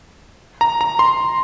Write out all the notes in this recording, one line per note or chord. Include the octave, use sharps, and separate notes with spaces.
A#5
A#5
C6